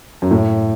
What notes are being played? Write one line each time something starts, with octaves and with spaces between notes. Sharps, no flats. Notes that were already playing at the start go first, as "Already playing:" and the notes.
F#2
A2